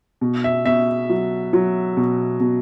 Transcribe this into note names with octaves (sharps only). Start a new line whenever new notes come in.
B2
E5
B2 E5
F#3
F#3
B2
B2